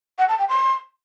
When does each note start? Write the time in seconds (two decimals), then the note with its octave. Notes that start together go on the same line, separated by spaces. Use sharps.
0.18 F#5
0.29 A5
0.39 G5
0.49 C6